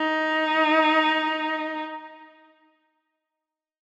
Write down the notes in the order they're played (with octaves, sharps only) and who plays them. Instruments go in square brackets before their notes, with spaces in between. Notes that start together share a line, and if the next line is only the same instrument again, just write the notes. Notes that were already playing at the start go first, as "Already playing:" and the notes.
Already playing: [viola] D#4